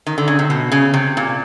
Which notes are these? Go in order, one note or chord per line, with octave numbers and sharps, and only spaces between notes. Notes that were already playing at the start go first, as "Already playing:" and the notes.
D#3
D3
C#3
C3
B2
C#3
C3
A#2